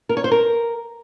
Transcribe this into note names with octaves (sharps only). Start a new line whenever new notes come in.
A#4
C#5
C5
A#4